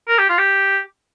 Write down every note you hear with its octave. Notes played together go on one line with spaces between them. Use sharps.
A#4
G4
F4
G4